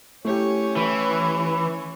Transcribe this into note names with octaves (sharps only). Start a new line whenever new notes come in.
A3 C#4 E4 G4 C#5
E3